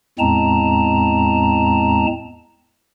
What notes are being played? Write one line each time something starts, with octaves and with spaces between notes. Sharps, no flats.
E2 A2 G#3 C4 A5 A#5